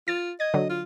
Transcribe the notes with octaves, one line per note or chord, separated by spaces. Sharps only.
F4 A6
D#5 G#6
D3 F#3
F4